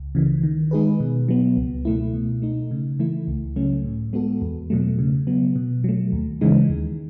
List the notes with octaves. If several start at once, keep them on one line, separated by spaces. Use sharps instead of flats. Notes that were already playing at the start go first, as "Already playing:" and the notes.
Already playing: C#2
C#3 E3
D#3
G#3 D#4 G#4 B4
B2
F#3 B3
C#2
B2 A3 E4
B2
A3 D#4
C#3
E3 A3 E4
C#2
C#3 F#3 A3 C#4
A2
G#3 B3 F#4 A4
E2
B2 F#3 A3
C#3
F#3 B3
B2
F#3 A3
D#2
C#3 E3 G#3 D#4
D#2